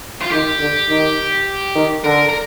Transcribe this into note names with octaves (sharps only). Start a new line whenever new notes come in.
F4
D#3 G4
D3
D#3
D#3
D3 A#4
A#4